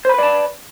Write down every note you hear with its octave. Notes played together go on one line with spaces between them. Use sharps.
B4 C5 D5 A5 B5